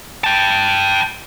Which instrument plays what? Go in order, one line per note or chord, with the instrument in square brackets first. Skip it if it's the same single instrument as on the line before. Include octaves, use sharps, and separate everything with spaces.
[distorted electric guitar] G5 A5